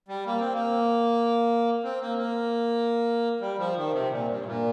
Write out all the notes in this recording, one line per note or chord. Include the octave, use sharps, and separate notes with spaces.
G3
A#3
C4
A#3
C4
A#3
A#3
G3
F3
D#3
C3
A#2
G2
A#2